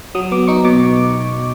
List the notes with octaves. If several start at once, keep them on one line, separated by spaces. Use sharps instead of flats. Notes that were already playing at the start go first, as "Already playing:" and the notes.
F#3 D#6
B3 D6
D#4 C#6
B2 D6